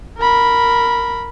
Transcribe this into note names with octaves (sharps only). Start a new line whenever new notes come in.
A#4 B5